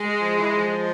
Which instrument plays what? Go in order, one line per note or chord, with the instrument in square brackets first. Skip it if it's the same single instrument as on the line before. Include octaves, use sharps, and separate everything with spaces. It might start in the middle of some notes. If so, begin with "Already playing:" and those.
Already playing: [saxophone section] G#3
[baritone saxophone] F3
E3
F3